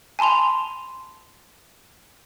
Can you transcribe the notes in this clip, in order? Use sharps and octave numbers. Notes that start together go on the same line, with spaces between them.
G#5 A5 B5 C6 F7